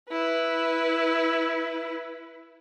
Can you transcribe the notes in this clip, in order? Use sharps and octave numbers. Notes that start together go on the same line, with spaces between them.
E4 B4